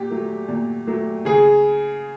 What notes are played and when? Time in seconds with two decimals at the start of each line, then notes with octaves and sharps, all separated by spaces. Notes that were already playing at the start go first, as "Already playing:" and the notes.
Already playing: A#2 G4
0.10 F#3 A3
0.48 A#2
0.87 F#3 A3
1.25 C#3 G#4